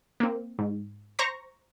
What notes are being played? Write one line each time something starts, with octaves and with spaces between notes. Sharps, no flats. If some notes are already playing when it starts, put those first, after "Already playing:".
A#3 C4
G#2
C5 A#5 C#6 A#6